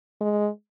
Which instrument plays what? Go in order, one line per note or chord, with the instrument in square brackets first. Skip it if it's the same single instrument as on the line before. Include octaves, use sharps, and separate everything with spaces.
[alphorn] G#3